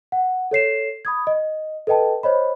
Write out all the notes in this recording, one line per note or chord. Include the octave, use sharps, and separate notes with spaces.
F#5
A4 C#5 C7 E7
B5 D#6 G#6
D#5
A4 B4 D#5 G5 A5
C5 C#5 D#5 B5